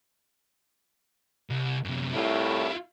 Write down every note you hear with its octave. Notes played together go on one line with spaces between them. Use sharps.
C2
F#2 C3
C2 A2 E4 F4